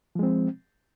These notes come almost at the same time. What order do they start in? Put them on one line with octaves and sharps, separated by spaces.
F3 G#3 C4